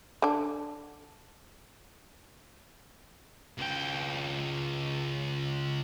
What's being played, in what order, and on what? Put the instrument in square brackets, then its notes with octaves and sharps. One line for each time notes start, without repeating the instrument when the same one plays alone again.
[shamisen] D3 D4
[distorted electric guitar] C#2 G5